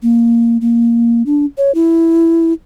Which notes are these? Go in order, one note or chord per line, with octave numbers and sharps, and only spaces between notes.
A#3
A#3
D4
C#5
E4